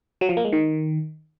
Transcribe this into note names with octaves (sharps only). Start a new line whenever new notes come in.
F#3
F3
A#3
G#3
D#3